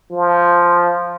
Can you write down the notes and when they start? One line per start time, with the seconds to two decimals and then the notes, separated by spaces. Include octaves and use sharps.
0.12 F3